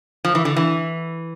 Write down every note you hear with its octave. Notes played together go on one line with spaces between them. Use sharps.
F3
E3
D3
E3